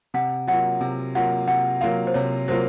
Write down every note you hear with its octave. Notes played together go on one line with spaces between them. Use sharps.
C3 F#5
F#3 A#3 F4 F#5
C3
F#3 A#3 F4 F#5
C3 F#5
F#3 A#3 F4 F5
C5
C3 C#5
F#3 A#3 F4 C5